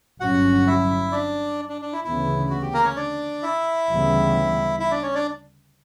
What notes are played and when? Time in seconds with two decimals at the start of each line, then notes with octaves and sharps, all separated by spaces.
0.20 G1 G2 F#3 C#4 F#4 F#5
0.67 E4 E5
1.12 D4 D5
1.69 D4
1.82 D4
1.93 E4
2.04 D2 C#3 E3 B3 E4
2.50 F#4
2.62 G4
2.73 A#3 A#4
2.84 C#4 C#5
2.96 D4 D5
3.43 E4 E5
3.89 D2 C#3 E3 G3 B3
4.80 E4 E5
4.91 D4 D5
5.03 C#4 C#5
5.15 D4 D5